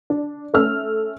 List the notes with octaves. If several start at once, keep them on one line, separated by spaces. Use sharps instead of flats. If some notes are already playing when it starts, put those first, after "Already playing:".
D4
A3 C#4 E6 F6